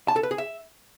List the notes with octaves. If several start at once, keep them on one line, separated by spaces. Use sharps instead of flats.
A5
A4
B4
G#4
E5